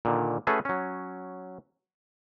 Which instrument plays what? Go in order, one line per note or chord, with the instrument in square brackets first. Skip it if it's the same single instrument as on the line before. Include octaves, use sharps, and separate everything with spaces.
[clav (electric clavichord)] A#2 D3 D#3
A3 C#4 F#4 G#4 A4 B4
F#3 C#4